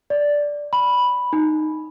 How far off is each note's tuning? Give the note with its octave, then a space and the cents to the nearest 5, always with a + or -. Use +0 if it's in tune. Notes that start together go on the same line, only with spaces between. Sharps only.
D5 -5
B5 -5
D#4 -10